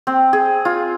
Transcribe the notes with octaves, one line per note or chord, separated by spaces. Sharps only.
C4
G#4
F4